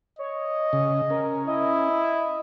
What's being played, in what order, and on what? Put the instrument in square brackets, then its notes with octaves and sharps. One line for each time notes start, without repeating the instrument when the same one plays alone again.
[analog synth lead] C#5 [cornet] D#5
[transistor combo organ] C#3
[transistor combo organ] C#4 [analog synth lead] A#4
[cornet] E4 [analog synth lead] D#5